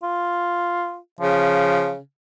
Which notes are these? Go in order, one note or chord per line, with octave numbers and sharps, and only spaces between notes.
F4
C#3 F3